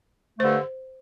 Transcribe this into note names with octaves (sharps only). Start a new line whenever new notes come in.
G2 D3 A3 C5